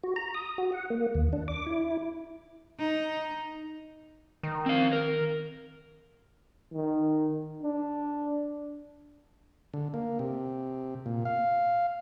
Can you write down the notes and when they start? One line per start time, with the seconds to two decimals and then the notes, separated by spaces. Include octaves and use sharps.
0.04 F#4
0.16 A#5
0.34 D#6
0.58 F#4
0.72 F#5
0.90 A#3
1.15 D#2
1.33 D4
1.48 D6
1.67 E4
2.79 D#4
4.43 D#3
4.66 C4 F5
4.93 A#4
6.73 D#3
7.63 D4
9.74 D3
9.94 A#3
10.19 C3
11.06 A#2
11.25 F5